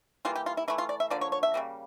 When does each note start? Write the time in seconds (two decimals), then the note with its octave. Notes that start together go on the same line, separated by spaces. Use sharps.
0.25 E3 G3 A#3 F4
0.36 G4
0.46 F4
0.57 E4
0.68 E3 A3 E4
0.78 F4
0.89 D5
1.00 E5
1.10 D3 F3 A#3 D5
1.21 C#5
1.32 C#5
1.43 E5
1.54 C#3 G3 A#3